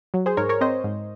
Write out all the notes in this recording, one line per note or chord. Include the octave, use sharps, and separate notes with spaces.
F#3
G#4 C5
G#2 A#4 C#5
A#4 C#5
C4 C5 D#5
G#2